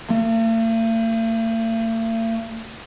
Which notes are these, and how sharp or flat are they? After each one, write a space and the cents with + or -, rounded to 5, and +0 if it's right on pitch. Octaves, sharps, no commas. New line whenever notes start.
A3 +45